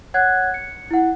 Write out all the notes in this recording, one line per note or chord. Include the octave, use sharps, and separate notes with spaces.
C#5 F#5 F#6 G#6
C#7
E4 F#5